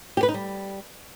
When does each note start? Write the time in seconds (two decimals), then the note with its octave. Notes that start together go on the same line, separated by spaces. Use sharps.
0.17 G4
0.23 B4
0.28 D#4
0.34 G3